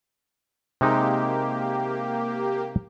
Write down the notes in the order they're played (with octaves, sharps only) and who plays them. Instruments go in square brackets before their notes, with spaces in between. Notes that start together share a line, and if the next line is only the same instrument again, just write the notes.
[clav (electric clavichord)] C3 G#3 D#4 [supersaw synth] A#3 G4